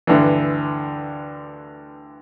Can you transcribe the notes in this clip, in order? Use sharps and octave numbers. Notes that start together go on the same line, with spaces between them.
D2 G2 D3 E3